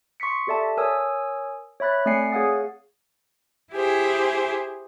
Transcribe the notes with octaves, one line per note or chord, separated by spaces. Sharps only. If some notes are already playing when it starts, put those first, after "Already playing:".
C6 C#6 D#6 B6 C#7
G4 A4 D5 E5 A5
A#4 C#5 G#5 D#6 E6
C#5 E5 B5 F#6 A6
A3 C4 D5 G#5 C7 C#7
G#4 C#5 F5 F#5 D#6 A6
E4 G4 G#4 C5